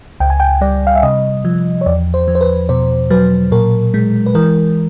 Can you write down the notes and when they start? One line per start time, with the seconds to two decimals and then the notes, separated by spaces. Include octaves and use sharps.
0.20 C#2 G5
0.30 G#5
0.40 G5
0.61 G3 D5
0.87 F5
0.95 E5
1.03 C3 D#5
1.45 F3
1.81 C#5
1.86 E2 D5
2.14 C5
2.28 F3
2.35 C5
2.41 B4
2.69 B2 C5
3.10 F#3 B4
3.52 A#2 A#4
3.94 G#3
4.26 B4
4.35 E3 A#4